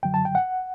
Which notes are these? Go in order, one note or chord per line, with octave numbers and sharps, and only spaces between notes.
F#2 D3 F#3 G5
A5
G5
F#5